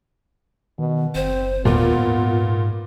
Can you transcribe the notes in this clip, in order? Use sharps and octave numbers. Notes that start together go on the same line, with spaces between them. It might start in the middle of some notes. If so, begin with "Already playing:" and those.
B2 D#3
F#1 C4 C5
D#2 A#2 B3 F4
G#2